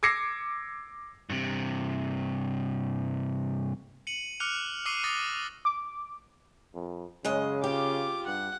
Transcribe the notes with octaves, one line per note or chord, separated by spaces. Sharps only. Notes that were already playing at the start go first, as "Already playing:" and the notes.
D6 E6 G#6 A#6 C7 C#7
G2 C3
C#7 D#7 F#7
D6 F6 F#6 C#7 F7
C#6 D6 E6 F6 C7 D#7
D6 D#6 F#6 A6 A#6
D6
F2
F#2 C#3 G#3 D#5
F4 G4 D6
G2 F#5